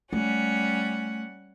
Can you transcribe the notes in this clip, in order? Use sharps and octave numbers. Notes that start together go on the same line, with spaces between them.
G3 A3 C#4 F#5